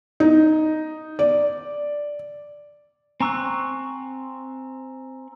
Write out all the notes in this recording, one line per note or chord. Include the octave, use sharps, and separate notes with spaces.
D#4
D5
C4 G#5 A#5 C#6 E6 F#6